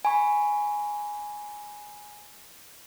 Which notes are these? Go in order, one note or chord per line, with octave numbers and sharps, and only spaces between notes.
G#5 B5 C#6